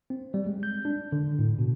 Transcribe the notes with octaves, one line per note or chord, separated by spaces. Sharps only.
C4
G3
G#3
G6
D4
D3
A2
B2